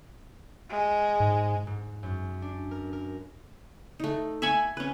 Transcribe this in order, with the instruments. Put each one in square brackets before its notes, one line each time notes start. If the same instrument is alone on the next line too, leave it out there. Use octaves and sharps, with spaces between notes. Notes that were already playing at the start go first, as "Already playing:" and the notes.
[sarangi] G#3
[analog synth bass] G#2
[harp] G#2
F#2
D4
A#4
A#4
[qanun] A3 D#4
E5 G#5 B5 C#6
C#4 B4